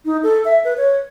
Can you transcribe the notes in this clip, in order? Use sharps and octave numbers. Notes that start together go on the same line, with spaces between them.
D#4
A4
E5
B4
C#5